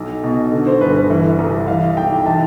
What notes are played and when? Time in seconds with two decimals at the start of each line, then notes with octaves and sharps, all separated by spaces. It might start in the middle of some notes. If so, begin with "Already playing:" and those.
Already playing: B1
0.23 B2
0.52 D3
0.67 C5
0.81 G1 B4
0.95 B4
1.10 E3
1.39 C2
1.67 E3 F5
1.97 B1 G5
2.26 E3 A5